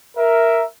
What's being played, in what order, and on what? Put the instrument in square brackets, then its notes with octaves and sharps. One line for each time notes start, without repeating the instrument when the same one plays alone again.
[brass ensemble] A#4 E5